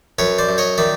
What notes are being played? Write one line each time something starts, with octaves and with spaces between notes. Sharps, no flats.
F#2 B4 C#5
C5 D5
F#2
C#5 D#5
D#3 D5 E5